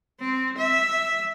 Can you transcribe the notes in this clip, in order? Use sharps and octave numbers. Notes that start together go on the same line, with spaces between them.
C4
E5